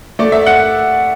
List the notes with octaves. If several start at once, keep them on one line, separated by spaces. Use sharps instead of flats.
A3 D5
E5
F#5